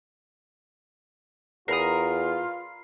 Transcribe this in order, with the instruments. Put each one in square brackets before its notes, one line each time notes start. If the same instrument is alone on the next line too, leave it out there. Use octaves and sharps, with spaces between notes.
[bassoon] E2 [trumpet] F4 [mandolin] A#4 D#6 [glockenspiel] B5 C7